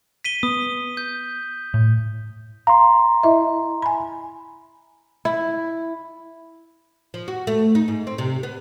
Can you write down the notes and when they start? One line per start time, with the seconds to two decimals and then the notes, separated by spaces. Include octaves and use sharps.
0.24 B6 D#7 G7
0.43 B3 D#6
0.97 G6
1.74 A2
2.67 F5 A#5 C6
3.23 E4 D#5 E5
3.82 G#5 B5
5.25 E4
7.14 F3
7.28 F#4
7.47 A3
7.75 D#4
7.88 G#2
8.07 C4
8.18 C3
8.43 B3